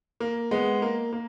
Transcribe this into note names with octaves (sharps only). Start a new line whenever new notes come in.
A#3
G#3 B3
A#3
A#3